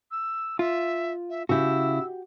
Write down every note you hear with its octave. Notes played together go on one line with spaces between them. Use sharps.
E6
F4 E5
E5
C#3 E4 F#4 G4 E6